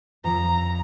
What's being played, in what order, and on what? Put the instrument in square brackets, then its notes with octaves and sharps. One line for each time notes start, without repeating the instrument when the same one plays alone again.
[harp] F2 F3 E6 [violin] A#5